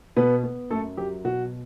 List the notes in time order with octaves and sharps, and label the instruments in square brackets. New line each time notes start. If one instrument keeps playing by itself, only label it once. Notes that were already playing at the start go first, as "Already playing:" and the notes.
[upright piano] B2 B3 B4
B3
F#2 A3 A4
F#3 G4
B2 F#4